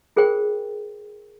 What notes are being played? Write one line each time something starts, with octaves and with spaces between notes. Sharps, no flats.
F4 G#4 A#4 C5 G5